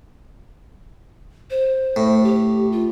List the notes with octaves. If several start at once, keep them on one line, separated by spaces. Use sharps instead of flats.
C5
A2
G4
F4